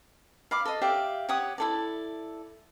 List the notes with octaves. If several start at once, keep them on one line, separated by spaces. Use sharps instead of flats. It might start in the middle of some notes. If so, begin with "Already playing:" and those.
F5 B5 D6
A4 D#5
G4 D5 E5 F5
G4 C#5 F#5 D#6
E4 A4 D5